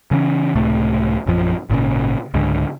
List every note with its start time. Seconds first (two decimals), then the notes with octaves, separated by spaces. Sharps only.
0.11 C#3 E3 C4 C#4
0.55 C#2 A2 C3 A3
1.26 A#1 F#2 F3
1.70 G#1 A#2 C#3
2.34 C#2 G#2 D3